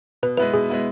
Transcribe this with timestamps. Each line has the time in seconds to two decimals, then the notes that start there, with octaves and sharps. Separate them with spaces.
0.23 B2 B4
0.37 G#3 B3 E4 B4
0.54 B2 G#4
0.69 G#3 B3 E4